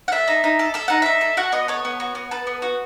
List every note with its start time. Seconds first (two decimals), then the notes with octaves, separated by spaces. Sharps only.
0.08 F#5
0.12 A4 E5
0.28 D#4
0.44 D#4
0.59 A4
0.74 A4 E5
0.88 D#4 F#5
1.02 D#4 E5
1.21 A4
1.37 F#4 F#5
1.52 B3 D#5
1.68 A4 C#5
1.85 B3
2.00 F#4
2.15 B3
2.31 A4 B4
2.47 B3
2.62 F#4